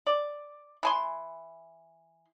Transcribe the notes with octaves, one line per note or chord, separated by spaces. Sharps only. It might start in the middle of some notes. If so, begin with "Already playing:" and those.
D5
E3 G#5 C6